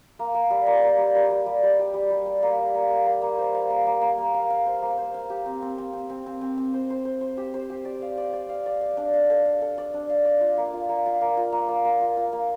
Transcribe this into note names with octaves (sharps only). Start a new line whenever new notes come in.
A#3
A#3
G3
A#3
A#3
G3
G3
G3
G3
G3
G3
G3
G3
G3
A#3
G3
A#3
A#3
A#3
A#3
C5
F5
A#3
A#3
A#3
A#3
F5
F5
C5
A#3
C5
F5
G4
C4
C4
C4
C4
C4
C4
C4
C4
C5
C5
C5
C5
G4
C5
G4
D5
F5
D5
D5
F5
D5
F5
D4
F5
A4
F5
A4
D5
D4
F5
D5
F4
A#3
F4
A#3
F4
A#3
F4
A#3
A#3
A#3
F4
F4
A#3